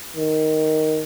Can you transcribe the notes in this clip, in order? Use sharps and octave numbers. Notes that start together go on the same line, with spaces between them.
D#3